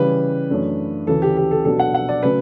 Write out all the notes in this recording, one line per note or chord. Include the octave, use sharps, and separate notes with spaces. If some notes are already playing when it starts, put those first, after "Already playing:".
Already playing: C#3 E3 G3 B4
F#2 E3 A3 D4
D2 C#3 E3 A4
G4
G4
A4
B2 F#3 B3 D4 A4
F#5
F#5
D5
C#3 F#3 A3 C#4 B4